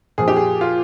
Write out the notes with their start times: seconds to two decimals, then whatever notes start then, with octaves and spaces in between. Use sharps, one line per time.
0.18 A#2 F3 G#4
0.28 G4
0.37 G#4
0.61 F4